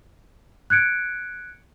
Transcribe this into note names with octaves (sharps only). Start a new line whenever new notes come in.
F#6 G#6 C#7 D7